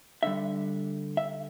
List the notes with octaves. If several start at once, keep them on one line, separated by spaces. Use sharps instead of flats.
D3 G3 E5
E5